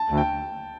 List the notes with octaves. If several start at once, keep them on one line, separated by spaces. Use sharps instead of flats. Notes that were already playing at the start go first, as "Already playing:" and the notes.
Already playing: A5
D2
G5